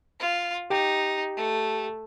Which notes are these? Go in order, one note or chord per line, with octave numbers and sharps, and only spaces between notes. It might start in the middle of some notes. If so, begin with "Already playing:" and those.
F4
D#4 G4 G5
A3